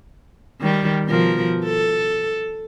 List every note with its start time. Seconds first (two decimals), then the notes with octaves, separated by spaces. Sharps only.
0.61 D#3 G3
1.07 B2 F3 A#4
1.65 A4